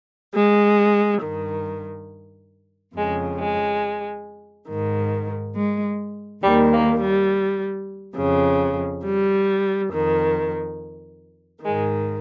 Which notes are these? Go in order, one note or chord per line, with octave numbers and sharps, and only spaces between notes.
G#3
G2 D#3
F2 C#3 G#3
G#3
G#2 D#3
G#3
D#2 D#3 G3
A#3
G3
F2 C#3
G3
F2 D#3
G#2 D#3 G#3